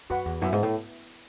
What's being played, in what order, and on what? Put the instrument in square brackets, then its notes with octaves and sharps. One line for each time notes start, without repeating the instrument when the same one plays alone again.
[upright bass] F#2 [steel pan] F#4 B4 F#5
[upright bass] E2
[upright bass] F#2 [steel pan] B3 E4 B4 E5
[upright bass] G#2
A2